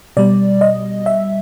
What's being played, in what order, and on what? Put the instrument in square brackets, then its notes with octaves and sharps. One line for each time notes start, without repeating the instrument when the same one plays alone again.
[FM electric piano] B2 G3 D5
D#5
E5